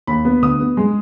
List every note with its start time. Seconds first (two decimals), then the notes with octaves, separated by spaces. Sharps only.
0.07 D#2 B5
0.25 B3
0.42 D2 D#6
0.60 B3
0.77 G#3